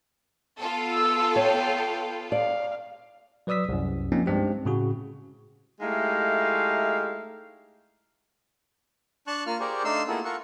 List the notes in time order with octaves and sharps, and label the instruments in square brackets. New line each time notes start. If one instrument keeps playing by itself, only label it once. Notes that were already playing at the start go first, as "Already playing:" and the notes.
[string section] B3 F4 A4
[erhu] E6
[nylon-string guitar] C#5 [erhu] G5
[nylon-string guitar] D5 [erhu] F5
[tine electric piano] F#3 B4 D5 D#6 E6 B6
C2 F#2
F3 A#3 C4 C#4 D#4
G2 G#3 C4 G4
A2 C#3 F#4
[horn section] G#3 A3 D#4 E4 G4 F5
[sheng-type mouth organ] D4 A5 C#6 F#6
A#3 F4 F6
G4 G#4 A#4 C5 D5 C#6
A3 D4 D#4 F5 C6 E6
A#3 B3 E4 F4 G#4 A4
F4 A4 A#4 F#5 C#6